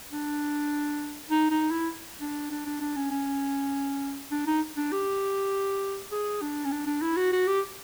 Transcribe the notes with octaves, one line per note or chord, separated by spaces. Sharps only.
D4
D#4
D#4
E4
D4
D4
D4
D4
C#4
C#4
D4
D#4
D4
G4
G#4
D4
C#4
D4
D4
E4
F#4
F#4
G4